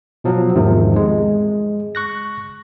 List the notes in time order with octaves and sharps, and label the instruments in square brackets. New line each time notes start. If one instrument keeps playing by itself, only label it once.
[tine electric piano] B2 F3 F#3
E2 G#2 C3 D#3 F3
G#3
C#6 F#6 A#6